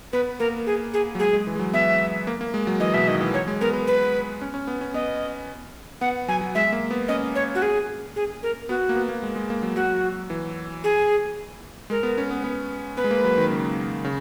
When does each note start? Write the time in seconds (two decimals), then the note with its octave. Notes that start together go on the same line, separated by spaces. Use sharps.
0.13 B3 B4
0.40 A#3 A#4
0.66 G#4
0.93 G#4
1.15 F#3
1.19 G#3 G#4
1.33 G#3
1.47 E3
1.56 G#3
1.59 F#3
1.73 B3 E5
2.27 A#3
2.41 A#3
2.54 G#3
2.67 F#3
2.80 E3 D#5
2.94 B2 E5
3.08 D#3 D#5
3.21 E3
3.34 F#3 C#5
3.48 G#3
3.61 B3 A#4
3.73 B3
3.87 B4
4.42 C#4
4.54 C#4
4.67 B3
4.81 C#4
4.94 B3 D#5
6.01 B3 F#5
6.28 F#3 G#5
6.41 F#3
6.55 G#3 E5
6.73 A#3
6.91 B3
7.08 C#4 D#5
7.35 C#5
7.55 F#4
7.62 G#4
8.16 G#4
8.43 A#4
8.69 B3 F#4
8.89 A#3
8.96 B3
9.09 A#3
9.23 G#3
9.36 G#3
9.50 A#3
9.63 F#3
9.76 F#3 F#4
10.30 E3
10.84 G#4
11.90 G#3 A#4
12.03 B3
12.18 C#4
12.31 B3
12.44 B3
12.97 B3 B4
13.04 G#3
13.11 A#3
13.24 F#3
13.38 D#3
13.51 C#3
14.05 C#3